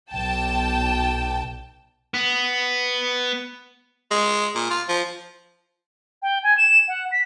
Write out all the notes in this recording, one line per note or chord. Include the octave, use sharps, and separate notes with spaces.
B1 G5 A5
B3
G#3
A#2
F4
F3
G5
G#5
E7
F#5
B6